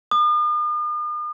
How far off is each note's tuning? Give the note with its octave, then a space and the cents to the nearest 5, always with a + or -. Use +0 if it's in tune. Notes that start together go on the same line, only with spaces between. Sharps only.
D#6 -45